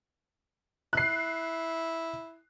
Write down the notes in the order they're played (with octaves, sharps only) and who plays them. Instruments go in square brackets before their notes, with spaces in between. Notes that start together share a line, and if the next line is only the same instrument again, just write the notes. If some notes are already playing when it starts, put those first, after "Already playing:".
[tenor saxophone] E4 [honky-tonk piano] F#6 C7